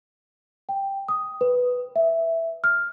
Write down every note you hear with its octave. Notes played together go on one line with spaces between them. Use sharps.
G5
D#6
B4
E5
F6